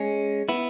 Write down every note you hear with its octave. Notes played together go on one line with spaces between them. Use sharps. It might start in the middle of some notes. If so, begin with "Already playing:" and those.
Already playing: G#3 C#4
B3 E4